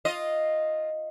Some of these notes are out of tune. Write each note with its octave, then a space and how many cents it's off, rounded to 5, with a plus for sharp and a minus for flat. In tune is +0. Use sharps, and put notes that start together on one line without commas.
F4 +0 D#5 +0